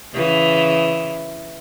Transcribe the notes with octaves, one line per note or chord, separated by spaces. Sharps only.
C#3 E3